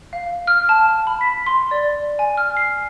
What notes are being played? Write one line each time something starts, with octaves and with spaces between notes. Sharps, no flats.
F5
F6
A5
B5
B6
C6
D5
G#5
F6
C7